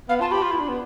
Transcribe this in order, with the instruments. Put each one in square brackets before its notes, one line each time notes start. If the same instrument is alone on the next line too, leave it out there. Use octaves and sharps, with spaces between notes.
[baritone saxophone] B3 [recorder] F5
[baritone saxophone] F4 [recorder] A5
[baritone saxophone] G4 [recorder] B5
[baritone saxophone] F4
E4
D4
B3